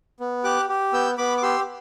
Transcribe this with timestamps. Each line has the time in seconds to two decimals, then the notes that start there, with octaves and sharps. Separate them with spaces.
0.20 B3
0.44 G4 D6 F#6
0.69 G4
0.93 B3 E6 G6
1.18 B3 B5 D6
1.37 D6
1.43 G4 C6 E6